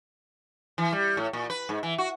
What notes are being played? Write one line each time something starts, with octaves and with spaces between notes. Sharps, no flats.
E3
G3
A2
A#2
B4
G#2
E3
F#4